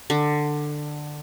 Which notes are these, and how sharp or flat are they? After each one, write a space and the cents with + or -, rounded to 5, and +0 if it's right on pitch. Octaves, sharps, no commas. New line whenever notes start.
D3 +15